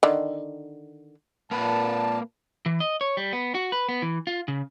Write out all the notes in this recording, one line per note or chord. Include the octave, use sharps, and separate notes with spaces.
D3 D#3
A#2 A#3 B4 A5
E3
D#5
C#5
G3
B3
F#4
B4
B3
E3
F4
C#3